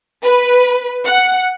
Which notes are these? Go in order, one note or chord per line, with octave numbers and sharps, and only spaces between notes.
B4
F#5